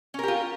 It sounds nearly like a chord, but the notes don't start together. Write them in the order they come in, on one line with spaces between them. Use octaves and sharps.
C#4 A#4 G4 F4